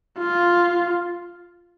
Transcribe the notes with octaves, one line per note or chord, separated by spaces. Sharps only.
F4